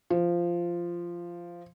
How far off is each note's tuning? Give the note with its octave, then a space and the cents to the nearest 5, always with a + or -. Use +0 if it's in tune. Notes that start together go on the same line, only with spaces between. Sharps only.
F3 -10